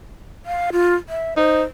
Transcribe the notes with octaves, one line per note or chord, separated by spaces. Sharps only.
F5
F4
E5
D#4 C5